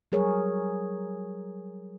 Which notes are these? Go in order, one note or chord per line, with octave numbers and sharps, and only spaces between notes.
F#3 G3 G#4 A#4 C#5